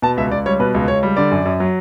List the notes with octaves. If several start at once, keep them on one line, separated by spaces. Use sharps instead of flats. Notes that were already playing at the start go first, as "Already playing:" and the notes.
B2 A5
C#2 E5
C#2 D5
G3 C#5
B2 B4
C#2
C#2 C#5
G3
D3 D5
F#2
F#2
F#3